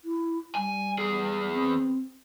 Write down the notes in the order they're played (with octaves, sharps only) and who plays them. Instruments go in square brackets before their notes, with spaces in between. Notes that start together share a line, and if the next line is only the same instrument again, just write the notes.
[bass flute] E4
[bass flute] G3 [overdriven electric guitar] G#5
[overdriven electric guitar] E2 G#4
[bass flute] C4